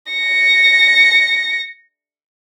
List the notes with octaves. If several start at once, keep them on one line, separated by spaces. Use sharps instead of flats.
A#6 C#7